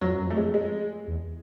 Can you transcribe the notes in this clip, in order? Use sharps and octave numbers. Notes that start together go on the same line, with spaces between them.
F2 F#3
F#2
F2 A3
G#3
G#3
E2